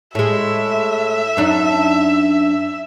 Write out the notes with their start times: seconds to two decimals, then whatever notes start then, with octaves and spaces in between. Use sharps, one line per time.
0.15 A2 G#3 E5
1.37 F#2 D4 D#4